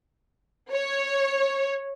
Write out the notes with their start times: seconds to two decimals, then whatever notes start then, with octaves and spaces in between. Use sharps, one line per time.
0.72 C#5